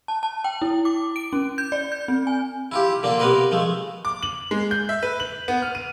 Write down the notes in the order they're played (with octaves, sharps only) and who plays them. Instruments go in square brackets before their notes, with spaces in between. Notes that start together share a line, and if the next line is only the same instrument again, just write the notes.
[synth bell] A5
A5
G5
E4
D6
D7
C#4
G6
D5
G6
C4
G#5
[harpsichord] E4 F4 G4
D3 A#3 D4 F4
C3 B3 A#4 B4 C6
F3 G#3 A3
[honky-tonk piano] D6
F#7
G#3
G6
E5
B4
F#7
B3
F6
D#7